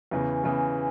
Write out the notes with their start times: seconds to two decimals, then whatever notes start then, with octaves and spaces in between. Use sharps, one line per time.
0.11 E2 C#3 E3
0.44 E2 C#3 E3